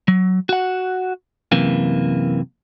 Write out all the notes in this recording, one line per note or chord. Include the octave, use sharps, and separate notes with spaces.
F#3
F#4 F#5
F#2 C3 E3 A#3